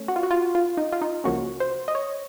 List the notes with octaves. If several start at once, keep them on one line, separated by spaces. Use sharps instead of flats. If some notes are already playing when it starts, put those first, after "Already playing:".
Already playing: A3 C#4
F#4
F4
F#4
F4
F4
D#4
F4
D#4
C#2 C#3 F3 A#3 C#4 F#4
C5
D#5
C#5